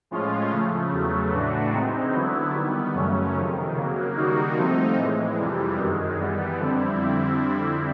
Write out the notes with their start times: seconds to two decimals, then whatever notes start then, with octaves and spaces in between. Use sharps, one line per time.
0.11 A2 F3 G#3 C#4 F4
0.51 C#3 F3 A3
0.92 E2 C#3 F#3 A3
1.32 A2 E3 A3 D4 F#4
1.73 C3 E3 G#3 C4 D#4
2.13 D3 F#3 B3 E4
2.54 D#3 G3 B3
2.94 F#2 C#3 F#3 A3 C#4
3.35 F2 C3 D#3
3.75 C#3 F#3 A#3
4.16 D#3 G3 A#3 D#4 F#4
4.56 C3 F3 A3 C4 D#4
4.97 A2 E3 G#3
5.37 F2 C3 E3 G3
5.78 F#2 D#3 G#3
6.18 E3 G3 B3
6.59 F2 D3 G3 C4 E4